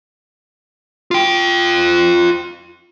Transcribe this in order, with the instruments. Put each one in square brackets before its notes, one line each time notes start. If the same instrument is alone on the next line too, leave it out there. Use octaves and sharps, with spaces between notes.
[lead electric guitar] F4 G5